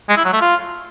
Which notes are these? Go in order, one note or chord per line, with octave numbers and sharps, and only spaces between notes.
G#3
E4
F#3
A3
F4